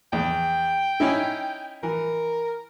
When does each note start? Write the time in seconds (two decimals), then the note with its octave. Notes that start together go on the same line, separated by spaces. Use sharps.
0.13 E2 G5
1.00 C#4 D#4 E4
1.83 E3 A#4